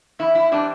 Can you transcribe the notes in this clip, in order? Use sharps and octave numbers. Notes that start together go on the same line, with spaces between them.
E2 E4
E4
E3 G3 C4 D4